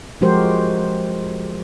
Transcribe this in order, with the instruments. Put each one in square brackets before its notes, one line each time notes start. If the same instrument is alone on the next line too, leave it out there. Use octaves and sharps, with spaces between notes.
[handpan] F3 G#3 F#4 G4 A#4 C5